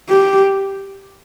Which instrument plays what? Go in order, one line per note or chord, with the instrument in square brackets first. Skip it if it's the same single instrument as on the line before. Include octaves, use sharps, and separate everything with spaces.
[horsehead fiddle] G4